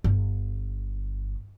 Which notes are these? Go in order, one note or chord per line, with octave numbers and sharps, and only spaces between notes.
G1